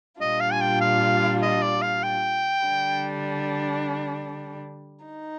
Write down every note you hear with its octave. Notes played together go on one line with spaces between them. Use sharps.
A#2 G3 D4 F4 D#5
F5
G#5
G5
F5
D#5
D5
F5
G5
D3 G3 D4
D#4